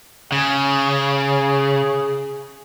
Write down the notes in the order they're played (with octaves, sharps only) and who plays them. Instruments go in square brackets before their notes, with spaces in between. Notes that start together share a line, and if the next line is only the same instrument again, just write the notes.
[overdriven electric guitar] C#3 [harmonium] G#4